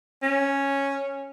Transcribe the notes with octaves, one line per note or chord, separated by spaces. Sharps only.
C#4